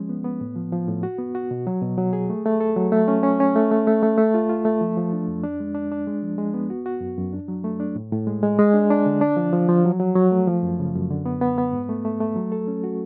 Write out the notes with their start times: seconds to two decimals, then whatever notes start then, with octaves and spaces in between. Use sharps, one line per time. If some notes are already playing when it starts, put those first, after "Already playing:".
Already playing: F3 G#3 C#4
0.09 B3
0.24 B3
0.41 A2
0.56 F3
0.73 F3
0.88 A2
1.03 F#4
1.19 B3
1.35 F#4
1.51 B2
1.67 F#3
1.82 B2
1.98 F#3
2.13 G#4
2.30 A3
2.46 A3
2.60 A4
2.76 F#3
2.92 A3
3.08 C#4
3.23 C#4
3.40 C#4
3.56 A3
3.71 A3
3.87 A3
4.03 A3
4.18 A3
4.34 F4
4.49 F4
4.65 A3
4.81 F3
4.97 F3
5.13 D4
5.28 F2
5.43 D4
5.60 G#3
5.75 D4
5.92 D4
6.07 G#3
6.23 F3
6.38 G#3
6.54 B3
6.70 F#4
6.86 F#4
7.01 F#2
7.17 F#2
7.33 D4
7.48 F#3
7.64 A3
7.80 D4
7.96 A2
8.12 A2
8.27 G#3
8.43 G#3
8.59 G#3
8.74 D4
8.90 D4
9.06 D3
9.21 D4
9.37 F3
9.53 F3
9.69 F3
9.85 F#3
9.99 F#3
10.16 F#3
10.31 A3
10.47 F3
10.63 F#2
10.79 C#3
10.95 F#2
11.10 D3
11.26 B3
11.41 B3
11.58 B3
11.73 G#2
11.89 A3
12.05 A3
12.21 A3
12.36 F#3
12.52 A4
12.68 C#4
12.84 F#4